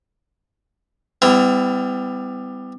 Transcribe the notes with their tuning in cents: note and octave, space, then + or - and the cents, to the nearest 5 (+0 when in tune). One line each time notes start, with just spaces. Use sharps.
G3 +20 B3 +45 E4 +0